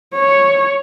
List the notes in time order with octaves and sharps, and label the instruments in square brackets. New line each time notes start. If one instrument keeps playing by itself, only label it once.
[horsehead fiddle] C#5